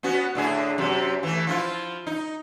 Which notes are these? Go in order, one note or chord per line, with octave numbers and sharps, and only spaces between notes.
B3 C#4 F#4
A2 D3 G#4
F#2 C3
E3 A3
F3 E4 F4
D#4